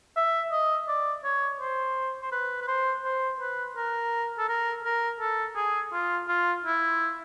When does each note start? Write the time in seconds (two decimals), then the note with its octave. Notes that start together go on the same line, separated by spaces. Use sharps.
0.16 E5
0.52 D#5
0.88 D5
1.24 C#5
1.61 C5
2.22 C5
2.32 B4
2.62 B4
2.68 C5
3.04 C5
3.40 B4
3.77 A#4
4.38 A4
4.49 A#4
4.85 A#4
5.20 A4
5.56 G#4
5.93 F4
6.28 F4
6.65 E4